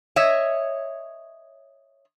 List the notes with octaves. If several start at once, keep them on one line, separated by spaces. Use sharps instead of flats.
C#5 D#5 E5